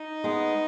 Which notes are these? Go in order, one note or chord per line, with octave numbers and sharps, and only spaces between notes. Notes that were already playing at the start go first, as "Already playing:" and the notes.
Already playing: D#4
G#3 B3